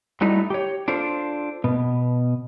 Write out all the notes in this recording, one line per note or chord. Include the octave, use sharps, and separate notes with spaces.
F#3 G3 A3 D#4 E4
G4 C#5
D4 F4 A4 C5
B2 B3